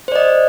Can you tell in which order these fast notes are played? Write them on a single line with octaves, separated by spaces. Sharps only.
C5 D5 D#5